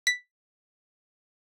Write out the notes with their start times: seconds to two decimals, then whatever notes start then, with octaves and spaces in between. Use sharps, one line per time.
0.07 B6